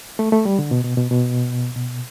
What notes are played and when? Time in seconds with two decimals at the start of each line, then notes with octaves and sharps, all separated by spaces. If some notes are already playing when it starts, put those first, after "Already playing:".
0.19 A3
0.32 A3
0.45 G3
0.59 D3
0.71 B2
0.84 B2
0.97 B2
1.11 B2
1.76 B2